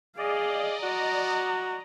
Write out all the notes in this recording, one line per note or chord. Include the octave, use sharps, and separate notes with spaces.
G#4 D5 D#5 F5
F#4 A#5